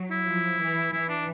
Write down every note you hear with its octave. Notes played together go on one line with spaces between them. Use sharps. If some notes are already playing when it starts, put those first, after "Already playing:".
Already playing: F#3
E4
F3
E3
E3 E4
D4